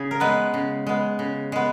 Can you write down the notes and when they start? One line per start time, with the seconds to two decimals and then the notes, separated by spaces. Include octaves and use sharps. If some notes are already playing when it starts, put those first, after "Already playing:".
Already playing: C#3 G#4
0.11 A#4
0.20 G#3 B3 B4
0.54 C#3
0.87 G#3 B3
1.19 C#3
1.52 G#3 B3